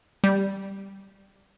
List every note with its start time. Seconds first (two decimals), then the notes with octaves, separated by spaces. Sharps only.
0.24 G3